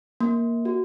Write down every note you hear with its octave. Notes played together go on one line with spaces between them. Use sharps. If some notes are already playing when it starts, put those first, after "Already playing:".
A#3
F#4